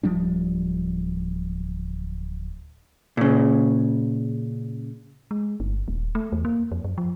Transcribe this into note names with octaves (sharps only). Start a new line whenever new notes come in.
D1 F3 G3 D4
A#2 C#3
G#3
G1
D#1
A3
E2
A#3
F2
F#2
F3